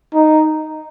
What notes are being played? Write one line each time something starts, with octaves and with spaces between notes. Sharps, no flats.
D#4